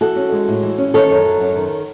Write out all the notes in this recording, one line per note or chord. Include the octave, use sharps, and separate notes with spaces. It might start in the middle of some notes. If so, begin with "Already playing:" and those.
E3 F#4 A4
C#4
G#3
A2
E3
C#4
D#3 A4 C#5
F#2
F#3
F#2
D#3